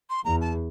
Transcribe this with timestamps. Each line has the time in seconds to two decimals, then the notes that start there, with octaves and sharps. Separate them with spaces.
0.10 C6
0.25 E2 A#5
0.41 A5